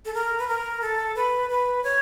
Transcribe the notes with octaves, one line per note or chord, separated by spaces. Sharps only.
A4
A#4
B4
A#4
A4
B4
B4
C#5